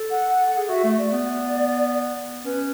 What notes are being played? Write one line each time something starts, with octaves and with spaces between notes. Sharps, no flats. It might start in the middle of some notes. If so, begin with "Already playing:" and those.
Already playing: A4
F#5
G#4
F#4 E5
A3
D5
B3
C#4 B4